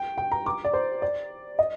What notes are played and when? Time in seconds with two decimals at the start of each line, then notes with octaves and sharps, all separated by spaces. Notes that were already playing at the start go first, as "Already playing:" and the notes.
Already playing: G5
0.18 G5
0.32 A#5
0.46 D6
0.65 D5
0.73 C5
1.02 D5
1.59 D#5